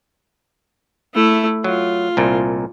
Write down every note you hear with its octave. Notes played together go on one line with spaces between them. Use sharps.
A3 E4
F#3 F4
C2 A#2